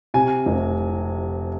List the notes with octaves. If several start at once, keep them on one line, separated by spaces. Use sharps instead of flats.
C3 G#5
F1